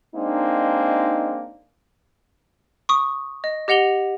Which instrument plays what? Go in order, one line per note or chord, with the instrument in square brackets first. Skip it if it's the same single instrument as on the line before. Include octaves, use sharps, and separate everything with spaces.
[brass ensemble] G#3 A#3 C4 D4 D#4
[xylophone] C#6 D#6
D#5
G4 D#5 F#5 F7 G7